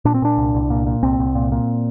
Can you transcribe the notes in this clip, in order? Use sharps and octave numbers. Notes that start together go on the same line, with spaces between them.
A#2 D4
C4
A#2 D4
C2
C2
A#2
A#2
C2 C4
C2
A#2
A#2